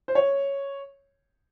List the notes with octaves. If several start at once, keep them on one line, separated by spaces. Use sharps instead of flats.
C5
C#5